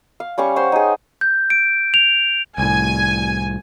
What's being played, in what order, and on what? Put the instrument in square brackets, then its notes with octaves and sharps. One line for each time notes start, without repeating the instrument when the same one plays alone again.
[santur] F5
G3 C#4 F5 C#6
C5 C#5 F#5 C6
D#4 G#4
[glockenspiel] G6
D7
F7
[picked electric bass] C2 A2 [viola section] G#5